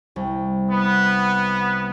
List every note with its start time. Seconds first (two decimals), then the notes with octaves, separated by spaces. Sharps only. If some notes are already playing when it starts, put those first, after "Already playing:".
0.16 C2
0.71 B3